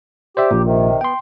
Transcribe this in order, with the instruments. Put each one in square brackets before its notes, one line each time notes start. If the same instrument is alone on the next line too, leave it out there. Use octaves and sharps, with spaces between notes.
[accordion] G4 [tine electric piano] C5 D5 E5
[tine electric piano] A#1 A#2
[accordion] C3 D#3
[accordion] B3 [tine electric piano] G5 C6